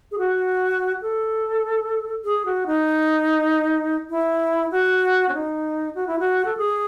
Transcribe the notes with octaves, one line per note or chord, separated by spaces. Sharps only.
G#4
F#4
A4
G#4
F#4
D#4
E4
F#4
C#4
D#4
F#4
E4
F#4
A4
G#4